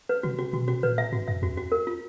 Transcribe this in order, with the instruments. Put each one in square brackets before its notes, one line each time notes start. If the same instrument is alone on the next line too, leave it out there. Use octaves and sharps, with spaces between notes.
[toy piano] B4
[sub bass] C3 [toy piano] F#4
[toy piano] F#4
[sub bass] B2 [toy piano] F#4
[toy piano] F#4
[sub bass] A#2 [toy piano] B4
[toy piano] E5
[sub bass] G#2 [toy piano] F#4
[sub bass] F#2 [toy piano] E5
[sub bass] E2 [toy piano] F#4
[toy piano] F#4
A#4
F4